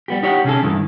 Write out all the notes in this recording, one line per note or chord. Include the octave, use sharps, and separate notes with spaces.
G3 B3 G4
D#4 G4 C#5 F#5
C3 C#4 G#4 A4
D2 G2 D#3 E3